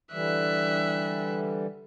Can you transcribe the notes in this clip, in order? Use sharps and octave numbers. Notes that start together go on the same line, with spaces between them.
D3 E3 G3 E5 F#6